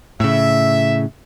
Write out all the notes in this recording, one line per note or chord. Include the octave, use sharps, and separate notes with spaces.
A2 C#3 E5